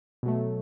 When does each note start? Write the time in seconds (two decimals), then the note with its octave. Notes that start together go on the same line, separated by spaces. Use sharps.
0.23 B2 F#3 A3